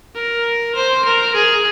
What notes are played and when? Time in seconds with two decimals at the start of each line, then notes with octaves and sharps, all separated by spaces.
0.15 A#4
0.75 C5
1.05 A#4
1.35 G#4